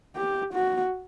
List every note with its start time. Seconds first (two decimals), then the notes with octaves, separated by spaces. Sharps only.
0.16 G4
0.55 F#4